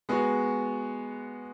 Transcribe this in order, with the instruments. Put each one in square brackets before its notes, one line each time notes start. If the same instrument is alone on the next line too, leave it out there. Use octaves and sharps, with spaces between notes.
[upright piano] G#3 B3 F#4